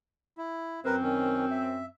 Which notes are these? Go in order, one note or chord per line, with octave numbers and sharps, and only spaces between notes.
E4
F#2 C4 A#4 B4
D#3 C#4
E5